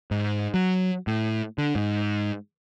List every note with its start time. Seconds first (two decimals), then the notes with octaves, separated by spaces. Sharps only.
0.11 G#2
0.54 F#3
1.07 A2
1.58 D3
1.75 G#2